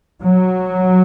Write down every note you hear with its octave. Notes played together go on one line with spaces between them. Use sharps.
F#3